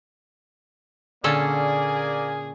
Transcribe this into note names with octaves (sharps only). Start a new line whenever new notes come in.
A#2 D3 A#3 C#4 G#4 A4 D5 G#5